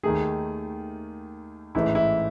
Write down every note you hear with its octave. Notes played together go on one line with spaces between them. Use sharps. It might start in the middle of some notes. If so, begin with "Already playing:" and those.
D#2 D#3 A3 G#4
A1 G#2 E3 A3 E4
E4